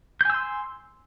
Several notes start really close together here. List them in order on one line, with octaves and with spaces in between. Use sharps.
G6 G#5 E6 C6